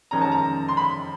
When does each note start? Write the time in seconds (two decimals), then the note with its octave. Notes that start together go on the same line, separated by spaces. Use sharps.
0.11 F2 C3 D#3 G#3 C#4 A#5
0.21 A5
0.32 A#5
0.68 C6
0.77 B5